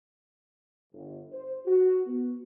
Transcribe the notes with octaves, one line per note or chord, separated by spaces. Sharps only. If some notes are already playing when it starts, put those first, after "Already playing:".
G1
C5
F#4
B3